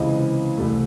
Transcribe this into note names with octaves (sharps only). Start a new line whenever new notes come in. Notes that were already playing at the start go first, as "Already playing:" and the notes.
Already playing: C#2 C3 E3 D#5
C2 C3 E3 A3